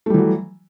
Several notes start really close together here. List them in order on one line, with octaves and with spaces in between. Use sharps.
A3 G3 E3 F#3